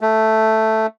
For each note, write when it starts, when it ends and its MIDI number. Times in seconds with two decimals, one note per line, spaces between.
0.01 0.86 57